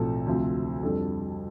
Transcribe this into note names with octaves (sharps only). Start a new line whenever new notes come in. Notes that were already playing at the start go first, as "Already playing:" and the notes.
Already playing: B1 A2 F3 C4 A4
D2 C3 F3 C4
F2 D3 G3 A4